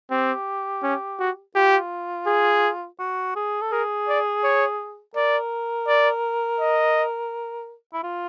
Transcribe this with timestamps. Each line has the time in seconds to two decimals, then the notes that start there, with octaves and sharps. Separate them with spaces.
0.11 C4 G4
0.83 C#4
1.19 F#4
1.55 F4 G4
2.27 G#4
2.99 F#4
3.36 G#4
3.61 A4
3.72 G#4 A#4
4.08 D5
4.44 C#5
5.15 A#4 D5
5.88 D5
6.61 D#5
7.94 E4
8.03 F4